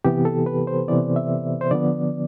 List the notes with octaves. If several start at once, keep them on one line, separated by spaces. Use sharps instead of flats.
C3 E3 B3 G4
A4
B4
C5
C3 E3 B3 D5
E5
C5
D3 F3 B3 D5